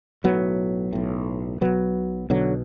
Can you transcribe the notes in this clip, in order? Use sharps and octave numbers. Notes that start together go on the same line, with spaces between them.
B1 A2 F#3 B3
B1 A2
B1 B2 F#3 B3
B1 B2 D3 F#3